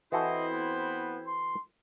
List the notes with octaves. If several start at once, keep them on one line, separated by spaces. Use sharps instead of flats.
E3 C4 E4 F#4 A4 C5 D#5
B3
C6